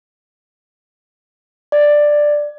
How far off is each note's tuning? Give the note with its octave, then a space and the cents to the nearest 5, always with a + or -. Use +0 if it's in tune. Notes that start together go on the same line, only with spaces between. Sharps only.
D5 +10